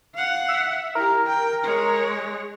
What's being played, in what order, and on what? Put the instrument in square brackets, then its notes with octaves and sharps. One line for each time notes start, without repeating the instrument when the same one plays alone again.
[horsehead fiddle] F5 F#5
[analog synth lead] E5
[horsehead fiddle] E4 G4 [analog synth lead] A#4
[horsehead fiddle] G5
G#3 C#5